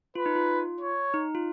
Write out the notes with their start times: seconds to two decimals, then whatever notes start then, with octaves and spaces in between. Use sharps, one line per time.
0.15 F4 B4
0.26 D#4
0.35 F4
0.81 C#5
1.14 D#4
1.35 F4